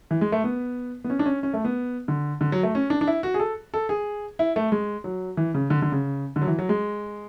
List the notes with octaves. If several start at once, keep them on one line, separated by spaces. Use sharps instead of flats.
E3
G#3
A3
B3
B3
C#4
D4
C#4
C#4
A3
B3
D3
D3
F#3
A3
C#4
D4
D4
E4
F#4
G#4
A4
A4
G#4
E4
A3
G#3
F#3
E3
C#3
D3
D3
C#3
D3
F#3
E3
F#3
G#3